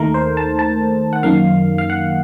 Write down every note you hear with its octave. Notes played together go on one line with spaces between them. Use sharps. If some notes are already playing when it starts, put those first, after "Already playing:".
Already playing: D#2 D#3 A3 A#4
C5
A5
A5
F#5
F#2 D#3 A#3 F5
F5
F#5